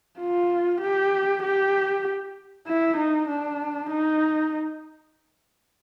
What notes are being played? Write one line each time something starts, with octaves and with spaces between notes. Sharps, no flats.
F4
G4
G4
E4
D#4
D4
D#4